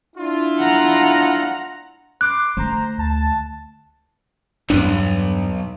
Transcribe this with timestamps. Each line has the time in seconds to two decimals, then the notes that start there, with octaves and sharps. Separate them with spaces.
0.16 D4 E4 F4
0.59 F#5 A#5
2.21 B4 C6 D6 F#6
2.57 D3 A3 C5 A#5
2.98 D2 A5
4.70 B1 E2 G2 D4